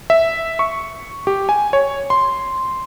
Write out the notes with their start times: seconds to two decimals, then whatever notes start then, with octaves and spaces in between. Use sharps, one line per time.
0.10 E5
0.59 C#6
1.27 G4
1.49 G#5
1.73 C#5
2.10 C6